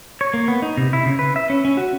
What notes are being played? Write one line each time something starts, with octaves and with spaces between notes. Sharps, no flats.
C#5
A#3
B3
D#4
C3
E4
C#3
B4
E5
C#4
C#4
F#4